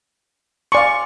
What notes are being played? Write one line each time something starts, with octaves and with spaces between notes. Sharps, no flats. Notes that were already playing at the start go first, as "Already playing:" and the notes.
D5 F5 G#5 C6 C#6